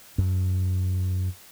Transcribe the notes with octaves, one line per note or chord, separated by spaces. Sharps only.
F#2